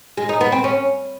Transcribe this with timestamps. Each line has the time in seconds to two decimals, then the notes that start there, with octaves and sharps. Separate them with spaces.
0.17 G#3
0.29 D#4
0.41 B3
0.52 C4
0.64 C#4